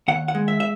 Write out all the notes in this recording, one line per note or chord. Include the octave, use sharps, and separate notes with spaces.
D#2 F#5
F#5
G#3
E5
E5